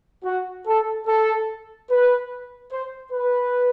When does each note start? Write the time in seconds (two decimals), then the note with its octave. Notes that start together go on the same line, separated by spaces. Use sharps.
0.24 F#4
0.67 A4
1.07 A4
1.90 B4
2.72 C5
3.12 B4